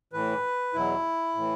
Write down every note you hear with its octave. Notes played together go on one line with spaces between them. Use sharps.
A2 E3 B4
E2 B2 F#3 E4
A2 E3